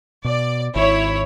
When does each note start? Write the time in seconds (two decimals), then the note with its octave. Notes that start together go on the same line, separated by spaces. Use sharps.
0.25 B2 D5
0.76 G#1 E4 C#5